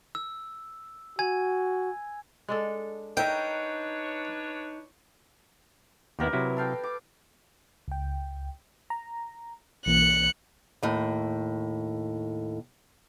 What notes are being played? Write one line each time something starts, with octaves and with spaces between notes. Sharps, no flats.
E6
F#4 G#5 G#6
G#3 D4 A4
D4 D#4 A#4 B4 C#5 E5 G5
D#2 B3 E4 G4 A#4 B4
C3 F#3 E4
A4 F5 G5
D6
C#2 G5
A#5
B1 E3 A#3 F#6 C#7
D#2 A2